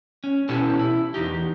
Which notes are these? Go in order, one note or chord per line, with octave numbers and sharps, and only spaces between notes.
C#4
B2 C#4 E4 G4 A4
E4
E2 D#4 G4